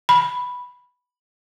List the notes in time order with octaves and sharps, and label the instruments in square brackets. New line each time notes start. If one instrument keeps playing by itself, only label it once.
[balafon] B5